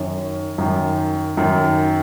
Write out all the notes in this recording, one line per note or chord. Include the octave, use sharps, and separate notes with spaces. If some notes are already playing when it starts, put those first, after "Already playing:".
Already playing: F#2 D#3 C#4
F#2 D#3
F#2 D#3